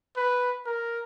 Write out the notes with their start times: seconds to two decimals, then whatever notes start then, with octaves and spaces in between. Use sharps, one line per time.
0.17 B4
0.66 A#4